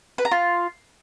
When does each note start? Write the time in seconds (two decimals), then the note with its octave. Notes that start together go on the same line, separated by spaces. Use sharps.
0.18 B4
0.25 A#5
0.31 F4